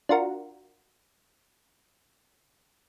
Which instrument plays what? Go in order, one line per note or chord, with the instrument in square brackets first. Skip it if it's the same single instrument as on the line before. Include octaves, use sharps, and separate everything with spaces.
[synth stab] D4 F4 F#4 A#4